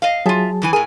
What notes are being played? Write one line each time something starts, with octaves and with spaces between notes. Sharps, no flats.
D#5 F5
F#3 F4 G#4 E5 A5
E2 E3 G#5
A2 G#4 A#4 G#5